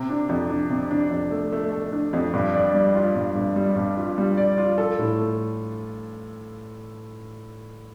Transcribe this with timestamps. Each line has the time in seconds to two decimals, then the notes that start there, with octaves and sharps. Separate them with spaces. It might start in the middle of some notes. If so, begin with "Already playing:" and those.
Already playing: C3
0.09 D4
0.29 F2
0.49 D4
0.70 C3
0.91 D4
1.10 F2
1.31 A3
1.52 A3
1.72 A3
1.92 D4
2.13 F2
2.33 G2
2.54 D5
2.74 G3
2.95 F4
3.15 G2
3.35 G2
3.56 G3
3.76 G2
3.97 F4
4.18 G3
4.37 D5
4.58 F4
4.78 A4
4.99 A2
5.19 A3